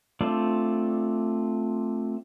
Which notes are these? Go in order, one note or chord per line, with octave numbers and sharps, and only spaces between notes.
A3 C4 D4 F4 D5